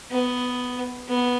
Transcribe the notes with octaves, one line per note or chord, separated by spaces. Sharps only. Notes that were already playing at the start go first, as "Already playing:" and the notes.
B3
B3